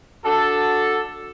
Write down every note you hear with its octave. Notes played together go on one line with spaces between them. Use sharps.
D4 F#4 A4